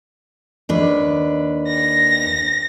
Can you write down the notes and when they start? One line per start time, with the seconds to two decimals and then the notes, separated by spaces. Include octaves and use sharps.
0.69 D#2 D4 B4
1.68 A#6